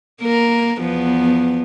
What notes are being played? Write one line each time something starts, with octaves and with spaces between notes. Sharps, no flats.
A#3 A#4
E2 F3 B3